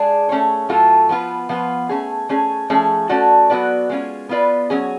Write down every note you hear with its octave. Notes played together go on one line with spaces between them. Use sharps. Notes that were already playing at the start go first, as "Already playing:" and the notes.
Already playing: G#3 D4 G#4
A3 C#4 G#4 C#5
A2 F#3 A3 F4 A4
F3 B3 F4 B4
F3 B3 F4 B4
A3 C#4 G#4
A3 C#4 G#4
F3 A3 C#4 G#4
A3 C#4 F#4 A4 D5
F#3 B3 F#4 B4 D5
G#3 C#4 F4
B3 F4 B4 D5
F#3 C#4 G#4